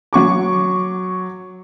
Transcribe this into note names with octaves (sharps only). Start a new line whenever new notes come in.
F#3 C#6 D6